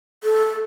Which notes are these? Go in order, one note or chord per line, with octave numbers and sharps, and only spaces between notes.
A4